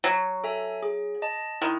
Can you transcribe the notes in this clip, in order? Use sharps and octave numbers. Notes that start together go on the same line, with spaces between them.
F#3 F#4
A4 E5 G#5
G#4
D#5 A5
D#3 E4